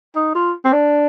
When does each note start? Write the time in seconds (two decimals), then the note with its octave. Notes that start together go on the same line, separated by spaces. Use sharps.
0.16 D#4
0.35 F4
0.65 C4
0.73 D4